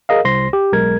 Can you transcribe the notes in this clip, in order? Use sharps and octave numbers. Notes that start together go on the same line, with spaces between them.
G#4 A#4 D#5 F5
C2 C5 C6 A#6
G4
B1 G#3 A#4 G#6